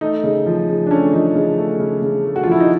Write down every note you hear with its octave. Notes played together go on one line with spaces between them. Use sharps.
A3 D#4
C#3
F3
C#3
D4
A3 C#4
F3 D#4
C#3
A3
C#3
C#3
A3
F#4
F4
F3 E4
D#4